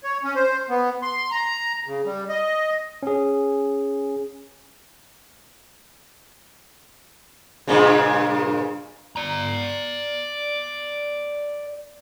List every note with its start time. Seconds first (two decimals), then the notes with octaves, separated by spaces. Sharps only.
0.04 C#5
0.23 C#4
0.36 C5
0.70 B3
1.03 C6
1.31 A#5
1.86 C#3
2.06 G3
2.29 D#5
3.03 C#4 G#4
7.68 G2 A#2 C#3
9.16 D5 A#5